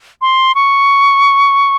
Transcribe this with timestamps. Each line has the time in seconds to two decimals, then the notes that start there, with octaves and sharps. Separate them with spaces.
0.22 C6
0.55 C#6